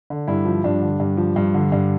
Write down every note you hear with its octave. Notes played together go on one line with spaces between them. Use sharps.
D3
G2 E4
F3
G2 D4
D3
G2
F3
G2
D3
G2